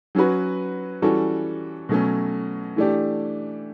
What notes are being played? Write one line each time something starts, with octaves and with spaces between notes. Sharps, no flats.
F#3 C#4 F#4 B4
E3 G3 C#4 F#4 A4
B2 F#3 A3 C#4
E3 A3 D4 G4